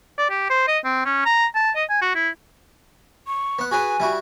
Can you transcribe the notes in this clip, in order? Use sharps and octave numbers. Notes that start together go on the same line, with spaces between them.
D5
G4
C5
D#5
C4
C#4
A#5
A5
D#5
G#5
F#4
E4
C#6
B3 F#5
F#4 G#4 B4 G#5
G3 E4 F#4